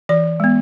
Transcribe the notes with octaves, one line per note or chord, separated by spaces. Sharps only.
E3 D5
G#3 B3